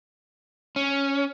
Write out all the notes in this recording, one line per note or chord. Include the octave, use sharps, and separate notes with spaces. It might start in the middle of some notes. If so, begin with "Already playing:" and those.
C#4